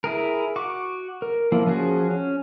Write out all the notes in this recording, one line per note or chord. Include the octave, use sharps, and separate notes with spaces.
E4 G#4 A#4
F#4 C#6 D6
A#4
F3 A#3 E4
F3 C#4 F#4 G#4
C#4